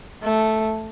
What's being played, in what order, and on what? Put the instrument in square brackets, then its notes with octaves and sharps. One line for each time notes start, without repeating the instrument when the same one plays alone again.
[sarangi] A3